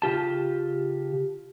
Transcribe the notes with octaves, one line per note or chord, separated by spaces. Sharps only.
C#3 F4 G4 A5